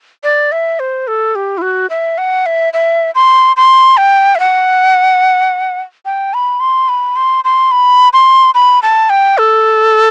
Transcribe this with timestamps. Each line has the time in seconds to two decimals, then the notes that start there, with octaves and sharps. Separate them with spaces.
0.23 D5
0.52 E5
0.80 C5
1.07 A4
1.35 G4
1.58 E4
1.62 F#4
1.90 E5
2.18 F#5
2.46 E5
2.73 E5
3.15 C6
3.57 C6
3.97 G5
4.35 E5
4.40 F#5
6.05 G5
6.34 B5
6.60 C6
6.89 B5
7.16 C6
7.44 C6
7.71 B5
8.13 C6
8.55 B5
8.83 A5
9.10 G5
9.38 A4